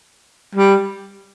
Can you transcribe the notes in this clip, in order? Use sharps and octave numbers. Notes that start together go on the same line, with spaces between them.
G3